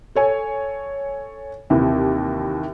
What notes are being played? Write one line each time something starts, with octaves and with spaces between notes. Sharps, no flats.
A4 C#5 G#5
D#2 C3 E3